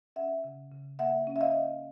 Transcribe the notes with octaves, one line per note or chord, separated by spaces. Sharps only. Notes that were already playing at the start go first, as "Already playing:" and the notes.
C#4 E5 F#5
C#3
C#3
A#3 E5 F#5
C#4
E5
D#5 F5